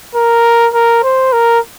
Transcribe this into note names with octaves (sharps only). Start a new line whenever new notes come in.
A#4
A#4
C5
A#4